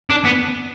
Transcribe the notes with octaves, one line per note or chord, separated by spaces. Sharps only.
D4
B3